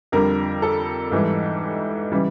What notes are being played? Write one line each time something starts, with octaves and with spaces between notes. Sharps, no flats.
F2 D3 G3 A#4
A4
G#2 E3 G3
C#3 E3 G3